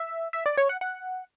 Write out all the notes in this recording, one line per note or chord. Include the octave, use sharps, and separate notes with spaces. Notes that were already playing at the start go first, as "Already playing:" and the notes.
Already playing: E5
E5
D5
C#5
F#5
F#5